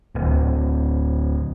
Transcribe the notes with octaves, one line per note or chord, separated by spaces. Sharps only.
D1